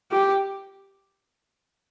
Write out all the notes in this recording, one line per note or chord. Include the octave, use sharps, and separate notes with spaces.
G4